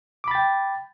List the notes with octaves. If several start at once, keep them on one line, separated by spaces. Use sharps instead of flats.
G5 B5 D6 A6